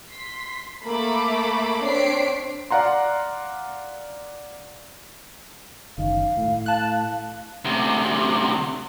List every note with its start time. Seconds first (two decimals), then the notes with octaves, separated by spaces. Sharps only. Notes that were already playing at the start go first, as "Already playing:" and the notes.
0.12 C6 B6
0.85 A3 A#3 A4 B5 D6
1.84 C4 D4 C#5 B6 C7 D7
2.71 D5 F5 F#5 A#5 C6
5.98 F#1 D#3 F5
6.37 A2
6.66 A5 F#6
7.65 D2 C3